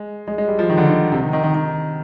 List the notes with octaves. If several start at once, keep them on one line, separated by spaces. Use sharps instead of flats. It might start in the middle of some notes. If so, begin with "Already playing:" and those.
Already playing: G#3
G#3
G#3
G3
F3
D#3
D3
D#3
C3
D#3
D#3
D#3
D#3